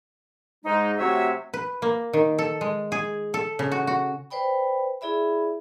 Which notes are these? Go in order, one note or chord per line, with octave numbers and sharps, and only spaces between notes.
G#2 G#3 D#4
C3 F#3 A3 C#5 E5
B4
A#3
D#3
A4
G#3
G#4
A4
C#3
F#4
F#4
B4 C5 D5 G5 B5
E4 G#4 D5 E5 B5